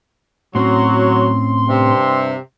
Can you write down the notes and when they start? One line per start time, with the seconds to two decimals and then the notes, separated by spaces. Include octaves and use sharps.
0.55 A2 F#3 C4 C#4 C6
1.68 G2 C3